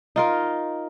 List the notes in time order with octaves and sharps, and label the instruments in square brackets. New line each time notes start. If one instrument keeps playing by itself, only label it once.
[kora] D#4 F4 A#4